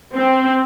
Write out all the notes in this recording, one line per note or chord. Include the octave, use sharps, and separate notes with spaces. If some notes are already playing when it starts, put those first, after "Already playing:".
C4